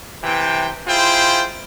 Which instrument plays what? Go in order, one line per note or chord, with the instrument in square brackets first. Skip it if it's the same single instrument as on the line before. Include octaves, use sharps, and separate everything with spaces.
[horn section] C3 E3 G5
E4 F4 G#4 C5 G5